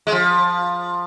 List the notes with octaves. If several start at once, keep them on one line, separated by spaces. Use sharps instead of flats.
G#3
F3